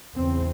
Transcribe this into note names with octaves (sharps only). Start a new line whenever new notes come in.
E2 C#3 C4